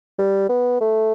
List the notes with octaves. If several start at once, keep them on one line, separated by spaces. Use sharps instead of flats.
G3
B3
A3